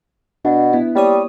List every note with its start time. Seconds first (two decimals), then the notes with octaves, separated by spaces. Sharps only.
0.45 B2 D4
0.73 B3 E4
0.95 G3 A#3 C#5 D#6